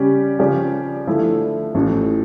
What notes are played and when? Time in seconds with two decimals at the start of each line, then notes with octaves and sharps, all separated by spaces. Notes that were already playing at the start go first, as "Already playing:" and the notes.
Already playing: C#3 G3 C#4 G4 D5
0.39 C#3 F3 C#4 G4 D5
1.07 D3 F3 A3 E4
1.74 A1 A2 F3